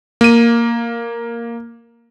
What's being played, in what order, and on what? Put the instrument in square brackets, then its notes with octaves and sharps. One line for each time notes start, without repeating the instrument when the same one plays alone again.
[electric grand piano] A#3 D#7